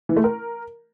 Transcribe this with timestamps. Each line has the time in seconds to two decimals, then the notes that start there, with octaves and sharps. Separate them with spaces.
0.09 E3
0.17 A3
0.24 A#4